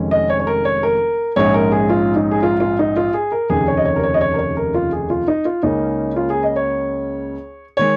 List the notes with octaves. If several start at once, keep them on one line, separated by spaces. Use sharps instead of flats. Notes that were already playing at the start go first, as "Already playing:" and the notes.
Already playing: F1 F2 D#3 G#3 C#4
D#5
C#5
C#5
A#4
C#5
A#4
A#1 G#2 G#3 C#4 C#5
A#4
G#4
F4
D#4
G#4
F4
F4
D#4
F4
G#4
A#4
F1 D#2 C#3 G#4
C#5
D#5
C#5
A#4
C#5
D#5
C#5
A#4
C#5
A#4
F4
G#4
F4
D#4
F4
C#2 C#3 A#3 C#4 D#4
F4
G#4
D#5
C#5
D#3 G#3 C#5